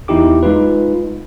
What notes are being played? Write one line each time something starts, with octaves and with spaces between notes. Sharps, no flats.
E2 D#4 E4 G4 D6
G#3 D#4 F4 B4